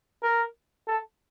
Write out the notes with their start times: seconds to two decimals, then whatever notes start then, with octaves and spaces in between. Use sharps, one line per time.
0.23 A#4
0.88 A4